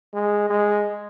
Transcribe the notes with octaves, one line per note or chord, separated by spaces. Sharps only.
G#3
G#3